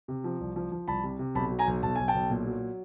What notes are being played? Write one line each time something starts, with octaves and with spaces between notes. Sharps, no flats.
C3
F3
C2
F3
F3
C2 A5 B5
C3
C3
B1 A5 B5
F#3
G#5 A#5
B1
B1 A5
B1 G#5
G5 A5
B1
A#2
F#3